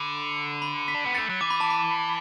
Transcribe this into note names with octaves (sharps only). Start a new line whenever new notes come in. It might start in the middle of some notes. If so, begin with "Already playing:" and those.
Already playing: D3 B5
B5
B6
D4
B3
A3 A6
F#3
E3 D6
B5
A5
B5